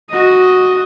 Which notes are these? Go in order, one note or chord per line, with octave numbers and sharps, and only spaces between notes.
F#4 D#5